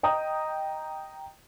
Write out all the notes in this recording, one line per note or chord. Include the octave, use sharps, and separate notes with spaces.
D#5 G5 A#5 D#6